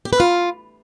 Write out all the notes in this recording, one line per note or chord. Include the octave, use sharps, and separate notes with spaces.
G4
B4
F4